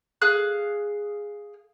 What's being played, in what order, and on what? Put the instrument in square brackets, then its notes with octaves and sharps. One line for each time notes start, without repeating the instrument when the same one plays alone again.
[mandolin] G#4 F5 F#6